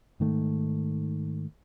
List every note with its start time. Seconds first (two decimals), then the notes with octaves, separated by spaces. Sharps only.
0.20 G#2 D#3 A3